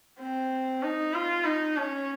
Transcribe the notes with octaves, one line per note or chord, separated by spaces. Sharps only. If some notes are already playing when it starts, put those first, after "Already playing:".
C4
D#4
F4
D#4
C#4